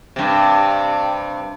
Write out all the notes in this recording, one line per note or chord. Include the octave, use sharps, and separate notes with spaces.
G2 C3